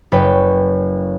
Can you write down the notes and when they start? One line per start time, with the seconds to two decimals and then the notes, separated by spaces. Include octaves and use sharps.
0.12 F#1 B4 C#5 G5